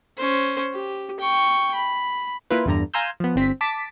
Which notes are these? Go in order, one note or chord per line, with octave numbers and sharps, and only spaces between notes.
C#4 C5
G4
G5 C#6
B5
A#3 E4 F4 B4
E2 G2 D3 A#5
F5 G#5 A#5 C6 E6 G6
F3 B3
G1 C4 B6
A5 D6 B6